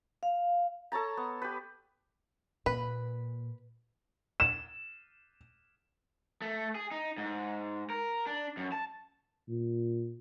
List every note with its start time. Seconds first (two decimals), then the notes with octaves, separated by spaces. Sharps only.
0.23 F5
0.92 A4 C#5 A5 A#5
1.17 B3
1.42 G4 B4
2.66 A#2 B4
4.40 E7
6.42 A3
6.75 G#4
6.91 D#4
7.18 G#2
7.90 A#4
8.26 D4
8.57 F#2
8.72 A5
9.49 A#2